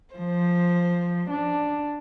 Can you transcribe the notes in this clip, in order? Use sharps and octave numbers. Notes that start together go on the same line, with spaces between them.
F3 C5
D4